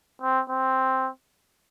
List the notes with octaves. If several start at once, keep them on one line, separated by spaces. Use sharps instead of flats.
C4
C4